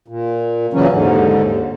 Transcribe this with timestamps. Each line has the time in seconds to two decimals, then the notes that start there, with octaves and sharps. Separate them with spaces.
0.08 A#2
0.73 A#2 C#3 E3 F#3 C#4
0.92 D#2 G#2 D3